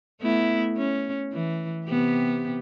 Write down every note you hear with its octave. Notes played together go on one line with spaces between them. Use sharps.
A3 B3 E4
C#4
E3
C3 B3 G4